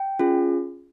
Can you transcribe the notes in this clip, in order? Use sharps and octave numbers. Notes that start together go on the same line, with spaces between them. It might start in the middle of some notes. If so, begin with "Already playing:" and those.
Already playing: G5
C#4 F4 G#4